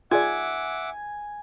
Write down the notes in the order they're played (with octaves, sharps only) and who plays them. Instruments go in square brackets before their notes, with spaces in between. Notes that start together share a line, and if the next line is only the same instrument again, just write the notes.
[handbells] F4 G#4 D5 [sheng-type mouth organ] E5 F#5 D6 [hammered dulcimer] G#5